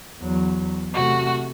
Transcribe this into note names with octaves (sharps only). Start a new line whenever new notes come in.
E2 F#3
C3 A3 F#4